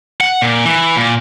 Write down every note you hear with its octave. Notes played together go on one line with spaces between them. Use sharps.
F#5
A#2
E3
A#2